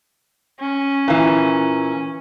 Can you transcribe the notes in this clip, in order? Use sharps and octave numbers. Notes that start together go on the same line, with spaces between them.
C#4
A#2 E3